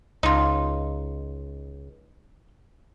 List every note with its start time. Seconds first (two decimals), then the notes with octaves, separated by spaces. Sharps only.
0.23 C#2 D#4 F4